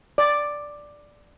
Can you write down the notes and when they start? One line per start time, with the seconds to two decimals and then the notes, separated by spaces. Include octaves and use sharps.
0.18 D5